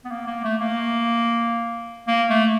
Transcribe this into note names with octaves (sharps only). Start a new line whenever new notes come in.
B3
A#3
A#3
A3
A#3
A#3
A3